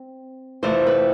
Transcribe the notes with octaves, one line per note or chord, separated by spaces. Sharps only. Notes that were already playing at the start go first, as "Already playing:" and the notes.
Already playing: C4
F2 C3 E3 A3 C5
B4